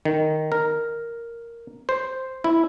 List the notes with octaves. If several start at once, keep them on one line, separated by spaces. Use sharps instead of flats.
D#3
A#4
C5
E4